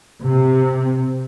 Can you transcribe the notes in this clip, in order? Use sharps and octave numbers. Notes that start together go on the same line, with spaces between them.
C3